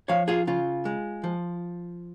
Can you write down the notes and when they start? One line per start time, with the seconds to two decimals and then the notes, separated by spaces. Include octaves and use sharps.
0.08 F3 C#5 F5
0.28 F4 G#4
0.47 C#3 F4
0.85 G#3
1.24 F3